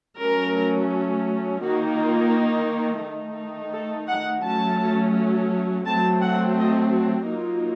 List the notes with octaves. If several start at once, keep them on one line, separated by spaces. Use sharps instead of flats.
F#3 A3 C#4 A#4
D#3 A#3 D#4 F#4
F4
D#3 A3 D#4
A4
F#5
F#3 A3 C#4 A5
F#3 A3 C4 A5
F#5
D#5
F#4
F#3 A#3 D#4 F4